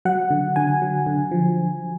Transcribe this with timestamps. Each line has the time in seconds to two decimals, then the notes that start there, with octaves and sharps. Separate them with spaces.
0.05 F#3 F#5
0.30 D3
0.56 D3 G#5
0.82 F#3
1.07 D3
1.31 F3